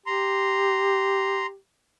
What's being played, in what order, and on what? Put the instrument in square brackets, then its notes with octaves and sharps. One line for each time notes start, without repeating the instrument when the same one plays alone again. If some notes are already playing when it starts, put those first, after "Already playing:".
[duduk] G4 [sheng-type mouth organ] A#5 C6